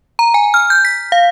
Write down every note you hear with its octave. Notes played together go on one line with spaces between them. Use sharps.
A#5
G#5
F6
G6
B6
F5